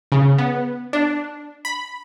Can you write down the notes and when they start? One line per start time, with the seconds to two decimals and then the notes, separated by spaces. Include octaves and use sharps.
0.12 C#3
0.38 B3
0.93 D4
1.65 B5